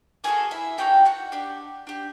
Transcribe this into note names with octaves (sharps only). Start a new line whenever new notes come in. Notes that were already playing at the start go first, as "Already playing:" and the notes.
A#3 D#4 F#4 G#4 A4 G#5
E4 E5
A#3 D#4 F#4 G4 A4 G5
F#4 F#5
D4 G4
D4 G4